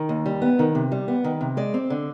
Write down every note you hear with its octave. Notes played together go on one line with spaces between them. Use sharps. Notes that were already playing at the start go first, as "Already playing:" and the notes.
Already playing: D#3
D#2
G3
B3
D#3
C3
G3
B3
D#3
C3
G#3 D5
C4
D3